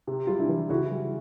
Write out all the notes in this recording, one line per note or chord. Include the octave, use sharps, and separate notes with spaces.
C3
G3 F4
D4 E4
E3
C#3 E4 F#4
G3